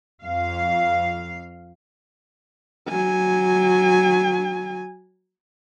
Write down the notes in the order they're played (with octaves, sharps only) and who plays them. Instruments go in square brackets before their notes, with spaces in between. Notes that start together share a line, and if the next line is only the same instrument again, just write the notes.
[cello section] F2 F5
[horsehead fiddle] F#3 G#5